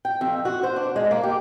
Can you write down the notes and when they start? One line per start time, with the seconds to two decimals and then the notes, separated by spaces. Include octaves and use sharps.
0.05 G5
0.21 F2
0.45 F#4
0.63 C5
0.76 D4
0.96 G#3
1.11 A#3
1.23 G4